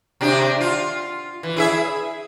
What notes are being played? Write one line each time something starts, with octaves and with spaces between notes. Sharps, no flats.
C3 D4 G4
F4
E3
E4 G#4 E5